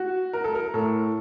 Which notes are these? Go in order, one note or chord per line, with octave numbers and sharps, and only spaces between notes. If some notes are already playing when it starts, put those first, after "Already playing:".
Already playing: F#4
A#4
A4
A#4
A2 A4